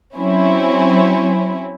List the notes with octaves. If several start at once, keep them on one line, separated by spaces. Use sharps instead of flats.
F#3 C4 C#4 E4